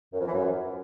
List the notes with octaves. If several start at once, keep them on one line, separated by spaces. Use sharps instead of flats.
F#2
F2
E3
F#2